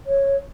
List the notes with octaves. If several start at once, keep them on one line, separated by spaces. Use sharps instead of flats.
C#5